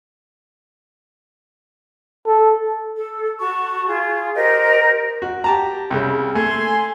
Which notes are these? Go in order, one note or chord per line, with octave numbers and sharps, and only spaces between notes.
A4
A4
F#4 A5 C#6
F4 G#4
G4 A#4 C5 D#5
F#4
G4 A5 A#5
C2 C#3
A3 G#5 C6